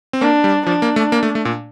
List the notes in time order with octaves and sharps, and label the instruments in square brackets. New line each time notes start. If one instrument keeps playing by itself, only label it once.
[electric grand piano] C4
[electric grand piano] A#3 [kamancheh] D4
[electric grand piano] G3
[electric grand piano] F3 [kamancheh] D4
[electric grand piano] A#3
A3
A#3
A3
A3
A#2